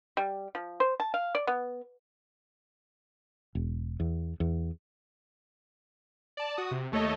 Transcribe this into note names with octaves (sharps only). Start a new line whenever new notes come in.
G3
F3
C5
A5
F5
D5
B3
E1
E2
E2
D5 A5
F#4 D#6
C3
D#2 A3 A4 C#5 D#5